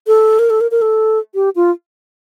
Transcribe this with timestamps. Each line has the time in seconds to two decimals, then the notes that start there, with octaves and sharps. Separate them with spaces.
0.07 A4
0.39 A#4
0.50 A4
0.61 A#4
0.71 A#4
0.82 A4
1.35 G4
1.56 F4